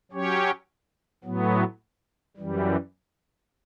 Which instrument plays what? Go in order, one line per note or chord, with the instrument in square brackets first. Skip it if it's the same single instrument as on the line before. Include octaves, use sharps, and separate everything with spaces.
[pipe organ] F#3 C#4 G4 C#5
A2 F#3 B3
F#2 E3 G3